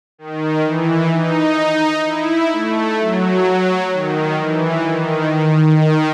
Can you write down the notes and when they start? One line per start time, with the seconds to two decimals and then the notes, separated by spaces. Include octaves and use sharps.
0.18 D#3
0.65 E3
1.12 D#4
2.05 E4
2.53 A3
2.99 F#3
3.92 D#3
4.40 E3
4.87 D#3
5.33 D#3
5.80 D#3